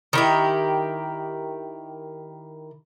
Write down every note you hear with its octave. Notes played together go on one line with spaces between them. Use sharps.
D#3 E4 G4